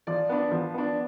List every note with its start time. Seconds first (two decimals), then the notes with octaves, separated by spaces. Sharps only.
0.07 F3 D5
0.29 B3 D4
0.51 F3
0.74 B3 D4